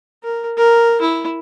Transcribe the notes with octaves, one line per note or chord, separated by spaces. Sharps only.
A#4
A#4
E4